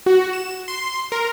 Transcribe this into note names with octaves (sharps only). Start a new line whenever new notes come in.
F#4
E7
C6
A#4